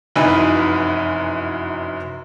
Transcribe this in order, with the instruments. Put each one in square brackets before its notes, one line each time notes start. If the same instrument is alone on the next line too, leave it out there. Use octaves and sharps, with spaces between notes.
[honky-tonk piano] F1 F#2 E3 D#4 B4 G#5